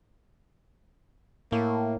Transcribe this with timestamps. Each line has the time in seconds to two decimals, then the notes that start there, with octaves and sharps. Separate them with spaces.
1.52 A2 A#3